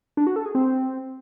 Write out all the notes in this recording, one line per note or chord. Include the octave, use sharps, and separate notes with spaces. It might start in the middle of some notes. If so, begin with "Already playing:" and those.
D4
F#4
A4
G#4
C4